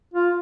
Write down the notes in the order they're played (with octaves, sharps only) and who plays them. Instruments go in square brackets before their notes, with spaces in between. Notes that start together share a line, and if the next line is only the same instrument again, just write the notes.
[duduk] F4